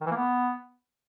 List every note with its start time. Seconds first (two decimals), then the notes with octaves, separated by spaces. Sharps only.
0.01 D#3
0.06 E3
0.12 A#3
0.17 B3